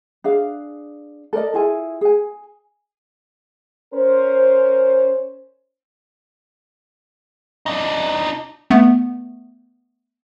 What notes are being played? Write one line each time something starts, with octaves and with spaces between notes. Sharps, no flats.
D4 G#4 F5
A4 A#4 D5 D#5
E4 F4 G#4 G#5
G#4 G#5
C#4 A#4 C5
D4 D#4
A3 B3